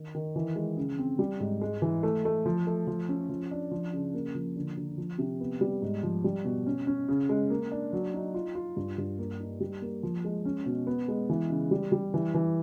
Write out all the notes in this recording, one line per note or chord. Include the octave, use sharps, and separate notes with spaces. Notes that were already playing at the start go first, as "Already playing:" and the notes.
Already playing: D#3
D#3
E3
G#3
C#3
C4
G3
G#2
G#3
E3
A3
A3
F3
A3
F3
C#4
F3
D4
F3
C#3
A#3
F3
D3
D3
F3
C3
B3
G3
G#2
F3
G3
B2
C#4
C#4
C#3
G#3
A#3
D4
F#3
D#4
F4
F4
G2
G2
A#3
D#4
G3
A#3
F3
G#3
C#4
B2
B3
G#3
E3
C#3
G3
G3
E3
E3